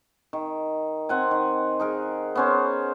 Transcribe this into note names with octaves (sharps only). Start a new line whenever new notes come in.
D#3
C4 F#5 G#5
D#3
D#4 G#4 A#4
B3 C#4 C5